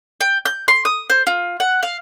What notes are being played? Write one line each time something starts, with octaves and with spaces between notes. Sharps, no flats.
G5
G6
C6
D#6
C5
F4
F#5
F5